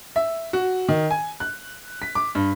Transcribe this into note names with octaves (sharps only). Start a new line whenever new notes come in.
E5
F#4
D#3
G#5
F#6
B6
D6
G2